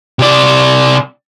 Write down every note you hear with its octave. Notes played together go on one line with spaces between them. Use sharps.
C3 D5